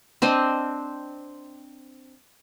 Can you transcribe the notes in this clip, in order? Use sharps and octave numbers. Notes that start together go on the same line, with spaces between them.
C4 D4 C5 D#5